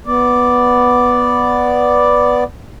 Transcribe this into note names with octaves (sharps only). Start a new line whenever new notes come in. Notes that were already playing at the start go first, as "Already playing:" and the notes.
B3 D5